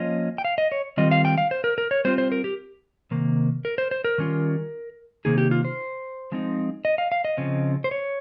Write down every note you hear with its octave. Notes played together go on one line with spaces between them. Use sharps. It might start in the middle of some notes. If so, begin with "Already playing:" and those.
Already playing: F3 A#3 C#4 F4 D#5
G5
F5
D#5
C#5
D#3 G3 C4 F4 D#5
F5
G5
F5
C5
A#4
A#4
C#5
G3 C4 F4 C5
C5
A#4
G4
C3 D#3 A#3
A#4
C5
C5
A#4
D#3 G3 C#4 F4
C3 D#3 A#3 D#4 G#4
G4
F4
C5
F3 G#3 C4 D#4
D#5
F5
F5
D#5
C#3 F3 C4
C5
C#5